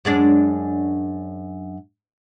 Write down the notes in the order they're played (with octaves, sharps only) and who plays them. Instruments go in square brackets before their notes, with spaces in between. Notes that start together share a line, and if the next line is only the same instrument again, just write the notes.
[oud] F#2 G#3 D4